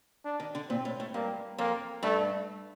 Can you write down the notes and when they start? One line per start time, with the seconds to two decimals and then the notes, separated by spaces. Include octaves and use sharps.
0.25 D4
0.40 D#3
0.55 D3
0.69 A#2 C4
0.85 A2
1.00 A2
1.14 G2 A#3
1.58 F2 A#3
2.03 G2 A3